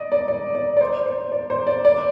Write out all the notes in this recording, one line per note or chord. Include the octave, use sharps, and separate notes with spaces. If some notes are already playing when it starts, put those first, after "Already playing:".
Already playing: D5 D#5
D5
D5
D5
D5
C5
C5
D5
C5
D5
D5